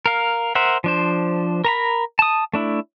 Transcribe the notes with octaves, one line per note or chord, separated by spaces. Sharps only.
A#4 F5
A#4 C5 E5 F#5
F3 D4 C5
A#4 A#5 B5
A5 D#6
A3 D4 E4